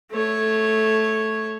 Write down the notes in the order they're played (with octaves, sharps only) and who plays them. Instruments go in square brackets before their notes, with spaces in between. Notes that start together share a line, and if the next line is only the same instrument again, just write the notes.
[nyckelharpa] A3 C#5